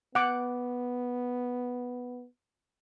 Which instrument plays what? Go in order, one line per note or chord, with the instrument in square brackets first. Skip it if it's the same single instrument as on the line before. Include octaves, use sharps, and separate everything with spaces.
[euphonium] B3 [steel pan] F#5 D6